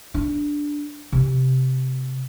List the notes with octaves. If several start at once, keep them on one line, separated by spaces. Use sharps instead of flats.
D4
C3